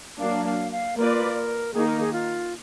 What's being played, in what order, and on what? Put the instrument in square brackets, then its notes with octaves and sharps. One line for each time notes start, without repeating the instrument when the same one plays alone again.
[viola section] F#3 A#3 D4 [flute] F5
[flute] F5
F5
[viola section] A#3 F4 B4 D5 [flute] A#4
[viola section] D#3 A#3 D#4 [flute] G#4
[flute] A#4
G#4
F4